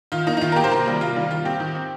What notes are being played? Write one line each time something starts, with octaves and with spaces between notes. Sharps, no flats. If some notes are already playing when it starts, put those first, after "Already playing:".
D#3 F4
A#3 D#4
D#4
D#3 F4
A#4
A#3 G4
C5
C3 A#4
D#3 G3 A#3
C3 F4
D#3 G3 A#3
D#3 F4
C4 G4
D#3
C4